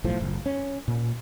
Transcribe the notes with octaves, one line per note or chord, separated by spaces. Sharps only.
B1 A2 F3
F#1
C#4
A#2